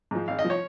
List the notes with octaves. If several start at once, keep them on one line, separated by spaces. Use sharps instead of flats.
G#2 F3
G#1 F5
D#5
F3
C#5